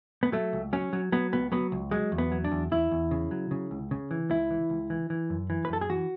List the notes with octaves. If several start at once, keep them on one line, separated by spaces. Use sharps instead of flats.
B3
F#3 A3
C#2
F#3 C#4
F#3
F#3 B3
C#2 B3
F#3 B3
C#2
F#3 G#3
E2
B3
F#3
D4
E2
E2 E4
E2
C#3
F#3
C#3
C#2
C#3
E3
C#2 E4
E3
C#2
E3
E3
F#2
E3
B4
F#2 A4
G#4
E3 F#4